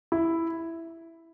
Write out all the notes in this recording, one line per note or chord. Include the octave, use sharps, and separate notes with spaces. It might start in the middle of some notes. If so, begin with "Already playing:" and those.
E4